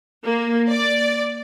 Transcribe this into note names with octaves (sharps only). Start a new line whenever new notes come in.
A#3
D5